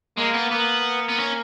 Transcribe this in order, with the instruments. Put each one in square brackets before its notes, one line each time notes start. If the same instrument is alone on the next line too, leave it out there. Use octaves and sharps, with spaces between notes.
[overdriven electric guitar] G#3 [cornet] A#3
[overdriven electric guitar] B3
[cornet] A#3 [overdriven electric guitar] B3
[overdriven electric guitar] B3
C#4